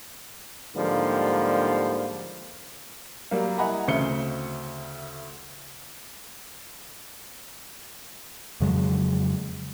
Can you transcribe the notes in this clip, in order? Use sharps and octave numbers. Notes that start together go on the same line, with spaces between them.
G#2 D3 F3 G3 A#3
F#3 G3 A#3
E4 D#5 F#5 G#5 A#5 B5
D2 C#3 C4 E5 C#7 G7
F2 C#3 F#3 G#3